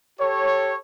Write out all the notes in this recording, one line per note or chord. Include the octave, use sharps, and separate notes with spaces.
G4 A4 C#5